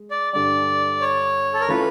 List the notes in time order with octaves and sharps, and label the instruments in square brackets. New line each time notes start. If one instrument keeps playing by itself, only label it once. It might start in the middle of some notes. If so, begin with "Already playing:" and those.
Already playing: [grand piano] G#3
[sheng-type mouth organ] D5
[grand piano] G2 D3 G3 [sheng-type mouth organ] D5
[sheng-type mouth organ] C#5
A4
A#4
[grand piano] E3 A3 C#4 F4 A4 [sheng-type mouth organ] B4